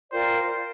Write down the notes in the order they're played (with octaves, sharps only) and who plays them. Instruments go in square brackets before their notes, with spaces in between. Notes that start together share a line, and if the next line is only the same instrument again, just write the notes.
[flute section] F4 A#4 D5 G5 [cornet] C5